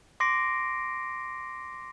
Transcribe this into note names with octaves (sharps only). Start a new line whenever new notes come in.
C6 D6 A#6 C7 D7